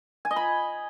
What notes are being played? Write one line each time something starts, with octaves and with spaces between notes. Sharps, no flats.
G#5
D#5
B5